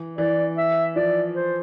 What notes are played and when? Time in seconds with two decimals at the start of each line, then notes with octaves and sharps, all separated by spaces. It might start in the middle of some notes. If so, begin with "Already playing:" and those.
Already playing: E3
0.18 E3 D5
0.57 E5
0.96 F3 D5
1.35 C5